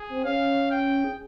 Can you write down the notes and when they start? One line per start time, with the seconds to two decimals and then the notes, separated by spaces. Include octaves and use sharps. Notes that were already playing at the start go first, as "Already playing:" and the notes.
Already playing: G#4
0.09 C4
0.24 C#4 F5
0.71 G5
1.04 G#4